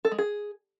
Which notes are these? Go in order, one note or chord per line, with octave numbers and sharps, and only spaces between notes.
A4
G#3
G#4